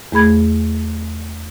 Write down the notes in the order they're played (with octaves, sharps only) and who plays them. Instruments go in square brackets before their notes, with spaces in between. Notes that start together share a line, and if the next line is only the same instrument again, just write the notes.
[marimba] E2 A3 G#4 B5 G#6